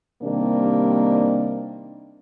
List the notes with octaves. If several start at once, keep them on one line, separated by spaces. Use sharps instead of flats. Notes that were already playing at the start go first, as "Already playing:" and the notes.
C3 D#3 G3 A#3 D4